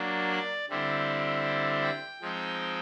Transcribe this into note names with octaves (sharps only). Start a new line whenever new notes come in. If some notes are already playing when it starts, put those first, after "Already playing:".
Already playing: F#3 A#3 D4
D5
D3 G3 C4 E4
G5
F3 G#3 C4 D#4